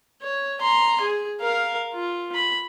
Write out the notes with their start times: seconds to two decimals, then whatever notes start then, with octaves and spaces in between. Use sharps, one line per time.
0.22 C#5
0.61 A#5 C6
1.01 G#4
1.41 A#4 F5
1.94 F4
2.35 B5